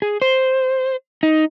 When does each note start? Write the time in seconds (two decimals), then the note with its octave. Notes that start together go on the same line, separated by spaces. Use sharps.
0.02 G#4
0.22 C5
1.23 D#4